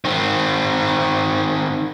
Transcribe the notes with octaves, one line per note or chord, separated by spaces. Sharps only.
D#3 C4